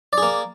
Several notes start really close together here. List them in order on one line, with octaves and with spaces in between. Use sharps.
D5 G#4 A#3